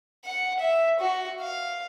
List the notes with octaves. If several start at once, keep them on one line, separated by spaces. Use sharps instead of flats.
F#5
E5
F#4
F5